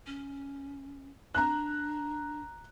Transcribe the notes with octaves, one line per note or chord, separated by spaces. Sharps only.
C#4
D4 A#5 F#6